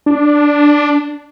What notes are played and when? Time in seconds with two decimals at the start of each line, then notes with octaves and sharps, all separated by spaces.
0.06 D4